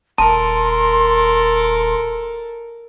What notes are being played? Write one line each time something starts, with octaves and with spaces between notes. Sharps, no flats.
D#1 A4 A#4 A5 C6